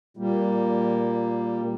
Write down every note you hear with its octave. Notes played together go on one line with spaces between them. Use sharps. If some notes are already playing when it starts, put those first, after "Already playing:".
A#2 G3 A#3